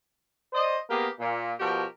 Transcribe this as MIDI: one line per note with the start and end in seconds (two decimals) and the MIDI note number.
0.53 0.77 72
0.53 0.77 74
0.53 0.77 75
0.89 1.08 58
0.89 1.08 59
0.89 1.08 67
0.89 1.08 68
0.89 1.08 70
1.19 1.52 46
1.59 1.83 47
1.59 1.83 53
1.59 1.83 66
1.59 1.83 67
1.59 1.83 70